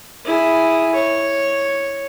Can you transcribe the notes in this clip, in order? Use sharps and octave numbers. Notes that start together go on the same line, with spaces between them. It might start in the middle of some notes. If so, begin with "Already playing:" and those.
E4 G#4
C#5